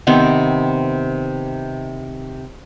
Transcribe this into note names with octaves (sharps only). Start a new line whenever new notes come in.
C3 D#3 B3 C4